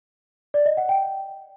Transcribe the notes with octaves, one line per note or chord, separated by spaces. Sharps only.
D5
D#5
F#5
G5